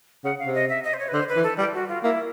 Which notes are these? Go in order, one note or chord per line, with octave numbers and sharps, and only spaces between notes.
C#3 F#5
F5
C3
D#5
E5
D#5
C5
C#5
B4
D3 C5
B4
E3
A4
G3 G4
F#4
F4
A#3 E4